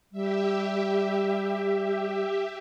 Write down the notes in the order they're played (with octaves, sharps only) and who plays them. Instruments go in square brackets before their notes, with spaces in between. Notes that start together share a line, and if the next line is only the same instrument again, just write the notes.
[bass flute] G3 [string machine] G4 E5